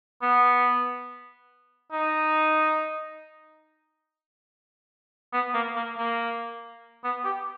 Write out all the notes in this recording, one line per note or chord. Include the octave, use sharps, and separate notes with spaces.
B3
D#4
B3
A#3
A#3
A#3
B3
G4